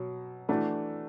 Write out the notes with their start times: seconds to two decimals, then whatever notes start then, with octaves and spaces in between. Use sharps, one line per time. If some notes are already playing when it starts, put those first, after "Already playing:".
Already playing: B2 F#3
0.49 E3 A3 D4 F#4